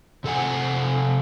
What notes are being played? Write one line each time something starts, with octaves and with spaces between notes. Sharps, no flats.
C3 A4 F#5 G#5